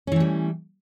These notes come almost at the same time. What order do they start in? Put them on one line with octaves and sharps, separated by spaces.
C#4 E3 A3 G3